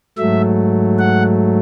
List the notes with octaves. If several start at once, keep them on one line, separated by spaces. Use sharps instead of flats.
G#2 F#3 A3 E5
F#5